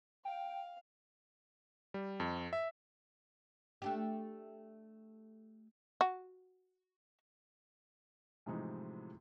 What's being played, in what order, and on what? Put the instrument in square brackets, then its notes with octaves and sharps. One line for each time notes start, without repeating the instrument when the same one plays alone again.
[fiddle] F5 [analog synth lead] G5
[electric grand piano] G3
F2
E5
[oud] A3 D4 G4
[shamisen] F#4
[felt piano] A2 C3 E3 F3 G#3 D#4